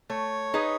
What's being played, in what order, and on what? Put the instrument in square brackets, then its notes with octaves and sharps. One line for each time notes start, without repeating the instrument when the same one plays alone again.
[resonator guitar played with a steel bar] A3 [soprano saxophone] C#5
[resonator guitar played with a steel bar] D#4 G#4 B4 D#5